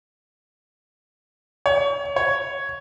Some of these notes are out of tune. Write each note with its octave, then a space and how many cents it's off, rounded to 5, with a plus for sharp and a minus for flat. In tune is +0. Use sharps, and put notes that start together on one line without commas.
C#5 +30
C#5 +5